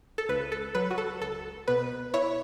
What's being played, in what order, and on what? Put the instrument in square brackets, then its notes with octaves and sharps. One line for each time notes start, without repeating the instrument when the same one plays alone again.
[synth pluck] A4
C#2 B4
A4
F#3 B4
F#4
A4
C#2 A4
B2 B4
E4 C#5